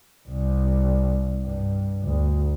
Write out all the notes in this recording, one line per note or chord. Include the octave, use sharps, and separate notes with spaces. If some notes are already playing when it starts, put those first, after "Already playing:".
C2
G2
D2